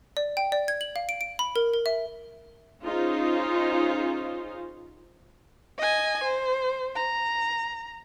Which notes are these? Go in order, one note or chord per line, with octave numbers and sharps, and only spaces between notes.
D5
G5
D5
G#6
F#7
F5
D7
D7
B5
A#4
A#4
E5
C#4 D#4 F4 G#4 C5
D#5 G#5
C5
A#5